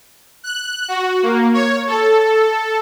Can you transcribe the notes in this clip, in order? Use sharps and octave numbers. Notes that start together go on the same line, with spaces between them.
F#6
F#4
A#3
C#5
A4